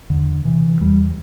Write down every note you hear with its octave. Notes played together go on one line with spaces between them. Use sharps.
E2 D3
C3 E3
E2 G3